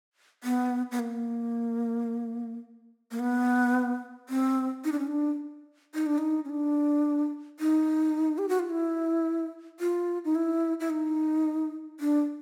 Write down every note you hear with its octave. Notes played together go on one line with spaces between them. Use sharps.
B3
B3
A#3
A#3
B3
C4
D#4
D4
C#4
D4
D#4
D4
D#4
C#4
D4
D#4
G4
F#4
F4
E4
F4
D#4
E4
E4
D#4
D4